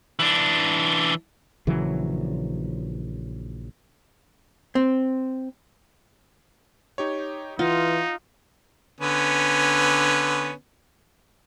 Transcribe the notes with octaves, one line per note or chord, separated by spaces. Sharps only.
E3 D4
A#1 C#3 E3 F#3
C4
D#4 G4 C#5
E3 D#4 F4 F#5
D3 B3 C#4